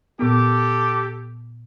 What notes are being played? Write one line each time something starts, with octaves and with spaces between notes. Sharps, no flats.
A#2 B3 G4 A4 D6